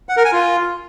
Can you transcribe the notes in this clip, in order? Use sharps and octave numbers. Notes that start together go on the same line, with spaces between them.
F#5
A#4
G#5
F4